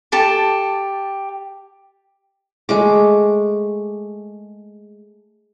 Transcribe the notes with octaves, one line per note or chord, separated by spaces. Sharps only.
G4 A4 A5 D6
G#3 A3 D6